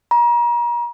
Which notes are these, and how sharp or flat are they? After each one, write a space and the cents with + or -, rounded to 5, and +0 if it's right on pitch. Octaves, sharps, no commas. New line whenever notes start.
A#5 +35